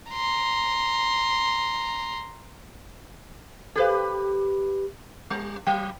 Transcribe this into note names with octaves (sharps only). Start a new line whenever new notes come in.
A#5 C6
G4 A4 B4 C5 F5
G3
F#3 G5